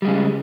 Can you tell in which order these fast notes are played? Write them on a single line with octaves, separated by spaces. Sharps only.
G3 G#3 C#3